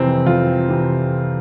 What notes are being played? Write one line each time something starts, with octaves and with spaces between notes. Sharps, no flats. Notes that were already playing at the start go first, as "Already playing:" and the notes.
Already playing: F2 C3 E3 C4
F2 F4
C3 E3